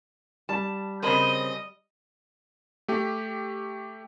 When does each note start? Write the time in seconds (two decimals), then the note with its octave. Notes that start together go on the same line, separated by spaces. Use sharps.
0.49 G3 A5
1.02 C#3 C4 A#4 C#5 D#5 B5
2.88 A3 G4